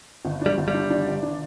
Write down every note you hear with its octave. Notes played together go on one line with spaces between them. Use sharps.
G1
G3 D4
G1
G3
D4
D4
G1
D4